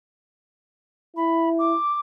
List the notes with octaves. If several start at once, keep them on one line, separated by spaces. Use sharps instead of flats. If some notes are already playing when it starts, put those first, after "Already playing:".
E4 B5
D6